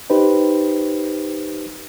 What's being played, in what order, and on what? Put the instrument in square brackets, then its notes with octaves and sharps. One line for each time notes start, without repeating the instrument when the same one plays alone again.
[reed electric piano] D#4 G4 B4 C5